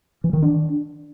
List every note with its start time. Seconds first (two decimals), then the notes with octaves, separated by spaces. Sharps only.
0.24 E3
0.33 D#3
0.42 D4